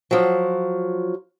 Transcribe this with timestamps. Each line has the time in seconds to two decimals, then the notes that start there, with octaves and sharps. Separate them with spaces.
0.11 F3 F#3